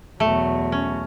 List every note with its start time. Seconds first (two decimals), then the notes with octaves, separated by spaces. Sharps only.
0.20 E2 B2 F#3 A3
0.72 C#4